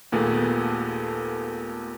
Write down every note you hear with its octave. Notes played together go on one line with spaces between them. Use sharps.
D#2 A#2 A3 B3 G#4